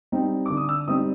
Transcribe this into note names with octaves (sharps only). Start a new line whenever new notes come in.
G3 C4 D#4
D3 D6
D#6
E6
G3 C4 D#4 D#6